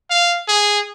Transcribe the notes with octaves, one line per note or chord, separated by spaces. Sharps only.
F5
G#4